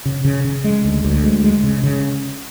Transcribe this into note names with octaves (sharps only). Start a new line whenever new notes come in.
C#3
C#3
C#3
G#3
D2
D2
G#3
G#3
C#3
C#3